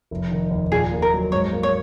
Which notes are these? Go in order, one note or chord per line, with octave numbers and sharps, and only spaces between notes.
F1
D#3
D#2
A#2 G#4
A#3
A#4
F#3
G#2 C#5
A#3
C#5